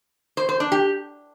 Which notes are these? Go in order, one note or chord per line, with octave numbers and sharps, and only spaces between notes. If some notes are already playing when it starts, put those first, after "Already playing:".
C5
C5
D4
G4